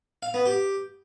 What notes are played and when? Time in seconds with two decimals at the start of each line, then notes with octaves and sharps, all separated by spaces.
0.23 F5
0.34 B3
0.46 G4